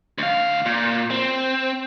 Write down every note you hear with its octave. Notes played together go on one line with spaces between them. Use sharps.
D2 F5
A#2
C4